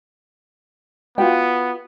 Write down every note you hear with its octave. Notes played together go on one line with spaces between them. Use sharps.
B3 F4 F#4 G5